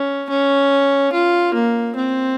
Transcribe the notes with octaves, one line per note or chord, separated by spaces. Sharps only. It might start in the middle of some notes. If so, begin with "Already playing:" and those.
Already playing: C#4
C#4
F4
A#3
C4